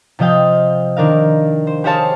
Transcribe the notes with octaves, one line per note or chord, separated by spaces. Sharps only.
C3 F3 D#5 F5 G5
D#3 D4 A#4 F5
C5
G4 G#4 C5 C#5 F5 A5